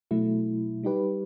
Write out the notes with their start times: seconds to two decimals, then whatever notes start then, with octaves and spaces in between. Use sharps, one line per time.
0.11 B2 F#3 A3 E4
0.83 G3 D#4 G4 B4